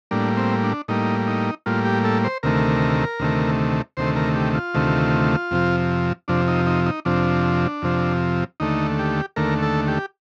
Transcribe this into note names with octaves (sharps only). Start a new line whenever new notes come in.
A2 G3 A#3 D4
C4
D4
A2 G3 A#3 D#4
D#4
A2 G3 A#3 F4
G4
A4
C5
D2 C3 D#3 A3 A#4
D2 C3 D#3 A3
D2 C3 D#3 A3 C5
A#4
G4
F4
D2 C3 D#3 A3
F2 C3 F3
F2 C3 F3 D4
D#4
D#4
D#4
F2 C3 F3 D4
F2 C3 F3
D#2 D3 A3 D#4
G4
D#2 D3 A3 A#4
A4
G4